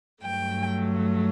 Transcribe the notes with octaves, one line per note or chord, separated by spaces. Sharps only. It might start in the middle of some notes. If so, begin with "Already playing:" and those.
G2 F#3 A3 G5